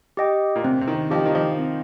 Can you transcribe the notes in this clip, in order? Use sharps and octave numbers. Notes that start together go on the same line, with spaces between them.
G4 D#5 G5
A#2
C3 C4
C3
D#3
F3 G4 D#5 G5
D#3
F3
C4